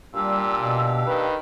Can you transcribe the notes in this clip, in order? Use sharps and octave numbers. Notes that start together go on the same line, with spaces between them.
A#2 G3 D4 G4 F5 E6
B2
D#3 B4